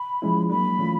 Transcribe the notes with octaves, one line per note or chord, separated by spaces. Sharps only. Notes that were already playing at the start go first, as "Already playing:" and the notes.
Already playing: B5
F3 G#3 C#4 E4
F#3 A#3 D4 B5
E3 A3 C#4 F4